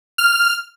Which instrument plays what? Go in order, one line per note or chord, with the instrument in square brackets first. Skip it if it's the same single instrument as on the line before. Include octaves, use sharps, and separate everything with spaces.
[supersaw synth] F6